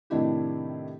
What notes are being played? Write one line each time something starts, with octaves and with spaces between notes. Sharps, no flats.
A2 C3 D#3 D4 E4 G4